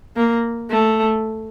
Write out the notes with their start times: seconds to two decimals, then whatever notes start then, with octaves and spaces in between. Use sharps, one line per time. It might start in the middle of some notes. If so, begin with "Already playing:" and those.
0.16 A#3
0.71 A3